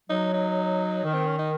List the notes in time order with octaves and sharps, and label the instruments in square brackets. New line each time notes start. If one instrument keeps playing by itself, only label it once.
[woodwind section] F#3 [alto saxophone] D#4
[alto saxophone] D#4
[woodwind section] D#3
[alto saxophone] C4
C#4
D#4